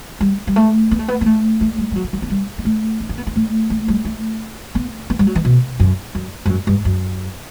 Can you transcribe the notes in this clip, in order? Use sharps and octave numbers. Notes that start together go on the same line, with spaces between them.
G3
G3
A3
B3
A3
B3
B3
A3
A3
G3
G3
F#3
D3
F#3
B3
G3
B3
A3
B3
C#4
B3
C#4
A3
A3
G3
A3
B3
B3
G3
F#3
E3
B2
F#2
F#2
G2
F#2
G2
F#2